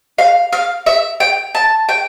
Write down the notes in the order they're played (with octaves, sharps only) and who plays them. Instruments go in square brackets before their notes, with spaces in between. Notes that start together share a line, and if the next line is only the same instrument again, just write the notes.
[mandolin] F5
F5
E5
G5
A5
G5